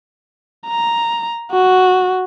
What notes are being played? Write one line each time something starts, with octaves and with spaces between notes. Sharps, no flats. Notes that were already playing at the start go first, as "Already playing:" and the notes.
A#5
F#4